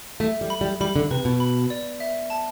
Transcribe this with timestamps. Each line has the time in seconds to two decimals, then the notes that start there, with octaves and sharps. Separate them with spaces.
0.20 A3 E5
0.41 G3
0.50 B5
0.61 G3
0.81 G3 B5
0.96 D3
1.11 C3 B4
1.25 B2
1.40 B5
1.70 D5
2.00 E5
2.30 A5